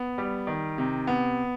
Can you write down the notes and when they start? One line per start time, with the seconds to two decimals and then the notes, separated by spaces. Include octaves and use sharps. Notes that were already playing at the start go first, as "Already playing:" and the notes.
Already playing: B3
0.18 G3
0.47 D#3
0.78 C3
1.07 B3